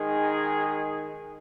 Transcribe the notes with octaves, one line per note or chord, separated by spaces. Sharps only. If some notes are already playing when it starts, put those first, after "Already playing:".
Already playing: D#3 G#3 D#4 G#4